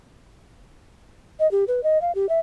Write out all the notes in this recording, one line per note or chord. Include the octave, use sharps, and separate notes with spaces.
D#5
G4
B4
D#5
F5
G4
E5